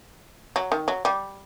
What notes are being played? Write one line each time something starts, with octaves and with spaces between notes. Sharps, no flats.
F#3
D#3
F#3
G3